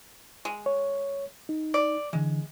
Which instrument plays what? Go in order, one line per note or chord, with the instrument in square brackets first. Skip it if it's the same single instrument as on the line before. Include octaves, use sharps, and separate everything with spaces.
[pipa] G#3
[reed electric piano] C#5
D#4
[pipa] D5
[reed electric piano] D3 E3 [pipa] G#3